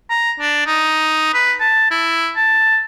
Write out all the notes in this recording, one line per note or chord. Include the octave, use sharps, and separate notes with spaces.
A#5
D4
D#4
B4
A5
E4
A5